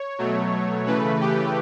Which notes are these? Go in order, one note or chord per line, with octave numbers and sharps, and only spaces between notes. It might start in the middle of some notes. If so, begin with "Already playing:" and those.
Already playing: C#5
B2 F#3 A3
C#3 E3 A3 B4
G4